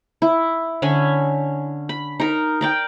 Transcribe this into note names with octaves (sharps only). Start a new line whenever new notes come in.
E4
D3 C#4 G#5 B5
B5
D#4 A#4
A#4 D5 G5